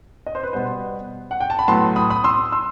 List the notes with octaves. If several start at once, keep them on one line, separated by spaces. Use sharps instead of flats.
D#5
C5
B4
B2 G3 B3 C5
F#5
G5
A5
B5
A2 F#3 B3 A5 C6
B5 D#6
B5 D#6
C6 E6
C6 E6